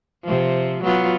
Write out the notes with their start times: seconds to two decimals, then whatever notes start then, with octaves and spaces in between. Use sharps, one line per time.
0.24 C3 F3
0.83 F#3 B3 F4